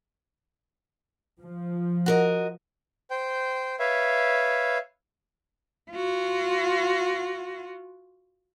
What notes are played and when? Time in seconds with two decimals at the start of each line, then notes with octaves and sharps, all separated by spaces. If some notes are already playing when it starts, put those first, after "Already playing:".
1.40 F3
2.06 F#4 A#4 D#5
3.11 C5 G5
3.79 B4 C#5 E5 F5
5.91 F4 F#4